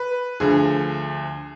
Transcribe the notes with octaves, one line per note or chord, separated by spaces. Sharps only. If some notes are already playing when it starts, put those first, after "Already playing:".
Already playing: B4
D2 D3 F3 G#4